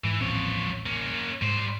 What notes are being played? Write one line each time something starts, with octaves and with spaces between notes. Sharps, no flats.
G#2 E3
D#1 A1 F3 C4 C#5
A#3 C#4
G#2 G3 C5